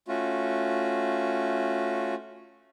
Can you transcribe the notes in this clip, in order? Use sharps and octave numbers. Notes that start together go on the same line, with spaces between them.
A3 C#4 F4 F#4